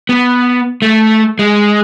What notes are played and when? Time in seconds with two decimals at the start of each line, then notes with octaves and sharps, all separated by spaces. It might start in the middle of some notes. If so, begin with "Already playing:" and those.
0.09 B3
0.82 A3
1.39 G#3